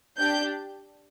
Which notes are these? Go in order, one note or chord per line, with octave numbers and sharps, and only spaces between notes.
D4 G4 G6